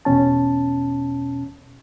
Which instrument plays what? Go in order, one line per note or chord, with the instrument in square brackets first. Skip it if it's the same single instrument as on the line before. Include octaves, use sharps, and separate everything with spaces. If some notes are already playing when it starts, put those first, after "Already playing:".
[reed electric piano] E2 B2 C#4 A5